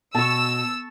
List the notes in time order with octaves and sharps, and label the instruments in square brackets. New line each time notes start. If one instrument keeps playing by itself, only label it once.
[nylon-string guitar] B2 [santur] A5 C#6 [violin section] E6